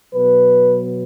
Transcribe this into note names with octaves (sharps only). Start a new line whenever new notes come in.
B2 F#3 B3 B4